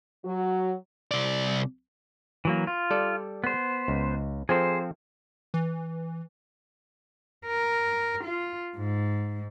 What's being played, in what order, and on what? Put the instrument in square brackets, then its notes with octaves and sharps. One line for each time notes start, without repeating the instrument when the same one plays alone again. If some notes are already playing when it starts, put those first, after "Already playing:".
[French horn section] F#3 F#4
[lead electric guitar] C2 D5
[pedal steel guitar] E3 F#3 A#3
F4
[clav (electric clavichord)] G3 A4 D5
[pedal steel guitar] B3 C5
[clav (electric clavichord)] C#2
[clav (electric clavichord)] F3 C4 A4 [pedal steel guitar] G#4 C5
[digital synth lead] E3
[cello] A#4
F4
G#2